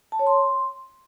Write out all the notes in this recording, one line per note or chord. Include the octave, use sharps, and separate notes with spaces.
A5
C#5
C6